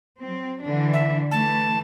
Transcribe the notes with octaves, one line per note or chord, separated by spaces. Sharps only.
F#3 C4
D3 E3 D4
E5
E3 A3 A5